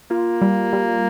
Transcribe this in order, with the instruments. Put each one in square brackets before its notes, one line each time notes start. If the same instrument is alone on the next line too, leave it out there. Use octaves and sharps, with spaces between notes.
[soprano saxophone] A#3 [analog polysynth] F4
[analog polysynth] G3
G3